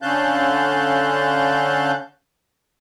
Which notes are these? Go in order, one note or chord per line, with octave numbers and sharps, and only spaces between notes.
D3 C#4 F5 A5 F#6 G6